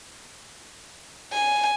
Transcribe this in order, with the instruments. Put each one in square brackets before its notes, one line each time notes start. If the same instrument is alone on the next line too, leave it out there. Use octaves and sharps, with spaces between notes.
[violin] G#5